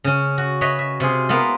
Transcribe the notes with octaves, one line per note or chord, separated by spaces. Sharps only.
C#3 C#4
F#4
B4 C#5 D#5 E5 B5
E5
C3 F4 G#4
A#3 B3 E4 F4